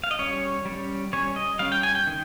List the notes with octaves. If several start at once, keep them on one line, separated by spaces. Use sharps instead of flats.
F5
D#5
G3 C#4 C#5
G3 C#4
G3 C#4 C#5
D#5
G3 C#4 F5
G5
G#5
G5
D#3